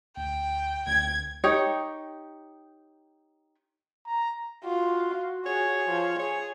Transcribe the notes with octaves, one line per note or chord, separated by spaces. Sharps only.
D2 G5
D2 G#6
D#4 G4 C#5
A#5
F4 F#4
G#4 C#5
F3
G#4 C#5